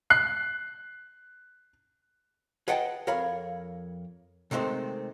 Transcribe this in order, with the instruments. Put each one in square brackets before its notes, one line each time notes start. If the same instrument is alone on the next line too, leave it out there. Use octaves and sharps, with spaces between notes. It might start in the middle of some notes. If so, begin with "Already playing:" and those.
[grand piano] F#6 C7
[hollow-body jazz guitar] G#4 B4 D#5 F#5 G5 A5
F2 A#4 C#5 F5 B5
C3 D#3 G#3 A3 C4